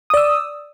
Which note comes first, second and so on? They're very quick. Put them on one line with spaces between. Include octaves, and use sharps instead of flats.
D#6 D5 E6